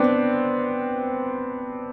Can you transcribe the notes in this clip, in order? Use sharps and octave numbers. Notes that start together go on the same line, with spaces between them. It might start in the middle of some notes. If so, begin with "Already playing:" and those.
Already playing: B3 C4 D4